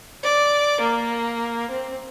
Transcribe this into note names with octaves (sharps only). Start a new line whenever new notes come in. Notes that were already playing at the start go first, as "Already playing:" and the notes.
D5
A#3
C4